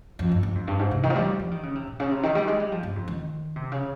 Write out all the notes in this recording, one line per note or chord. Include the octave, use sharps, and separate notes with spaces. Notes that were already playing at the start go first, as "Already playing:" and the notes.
F2
G2
G2
F2
G2
G#2
C3
D#3
F3
G3
F3
D#3
C#3
C3
A#2
C#3
C3
D#3
G3
G#3
G3
F3
G2
F2
D#3
C3
C#3